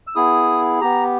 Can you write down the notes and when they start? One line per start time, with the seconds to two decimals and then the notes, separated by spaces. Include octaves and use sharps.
0.07 E6
0.15 B3 E4 G#4 D#6
0.81 B3 G4 A#5